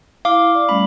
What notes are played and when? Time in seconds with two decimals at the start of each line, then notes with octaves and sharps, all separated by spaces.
0.25 E4 F5 D6
0.55 D5
0.69 G3 A3 C#4 B5